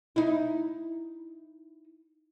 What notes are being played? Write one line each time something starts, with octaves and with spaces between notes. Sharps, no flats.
D#4 E4